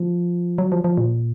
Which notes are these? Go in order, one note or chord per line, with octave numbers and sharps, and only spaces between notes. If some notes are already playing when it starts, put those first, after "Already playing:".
Already playing: F3
F#3
F3
F3
A#2